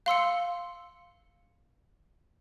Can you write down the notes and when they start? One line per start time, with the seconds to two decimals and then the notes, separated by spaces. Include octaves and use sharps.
0.06 F5 C6 E6 C#7